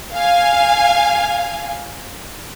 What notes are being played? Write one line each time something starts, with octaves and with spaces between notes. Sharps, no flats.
F5 G#5